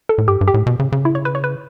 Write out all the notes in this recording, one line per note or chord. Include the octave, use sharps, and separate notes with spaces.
A4
A2
G2 G4
G2
G4
A2
B2
C#3
C#3
E4
C#5
B4
C#5
B4